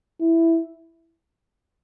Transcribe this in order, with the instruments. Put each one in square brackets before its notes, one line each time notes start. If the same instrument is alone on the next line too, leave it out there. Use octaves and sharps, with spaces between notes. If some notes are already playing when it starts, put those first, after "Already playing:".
[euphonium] E4